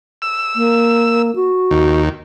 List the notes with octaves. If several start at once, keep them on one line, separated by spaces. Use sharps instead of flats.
E6
A#3
F#4
D#2